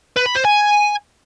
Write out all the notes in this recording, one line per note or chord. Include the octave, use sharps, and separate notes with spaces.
B4
B5
C5
G#5